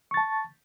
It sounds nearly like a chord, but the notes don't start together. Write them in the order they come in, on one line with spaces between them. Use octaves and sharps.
C#6 A6 A5